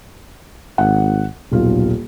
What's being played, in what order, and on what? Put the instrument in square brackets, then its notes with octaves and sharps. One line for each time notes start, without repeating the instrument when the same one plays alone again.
[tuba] G#1 [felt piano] F#5
[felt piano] D#1 F4 [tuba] B1